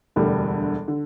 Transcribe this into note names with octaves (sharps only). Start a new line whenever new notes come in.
E1 D2 D3 G3
D3